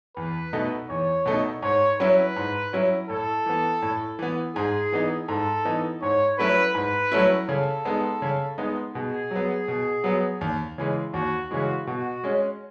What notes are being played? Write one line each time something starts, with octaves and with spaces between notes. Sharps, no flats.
E2 B4
B2 A3 D#4
E2 C#5
B2 A3 D#4
G#2 C#5
F#3 C#4 E4 B4
G#2
F#3 C#4 E4
A2 A4
E3 B3
A2
E3 B3
G#2 G#4
E3 B3 D#4
G#2 A4
E3 B3 D#4
G#2 C#5
F#3 A3 C#4 E4 B4
G#2 B4
F#3 A3 C#4 E4
C#3 A4
G#3 B3 D#4
C#3
G#3 B3 D#4
B2 G#4
F#3 B3
B2
F#3 B3
D#2
C#3 E3 G#3
D#2 F#4
C#3 E3 G#3 F#4
B2 F#4
G#3 C#4